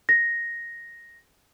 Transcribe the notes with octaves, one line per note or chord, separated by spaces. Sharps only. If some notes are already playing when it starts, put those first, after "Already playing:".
A#6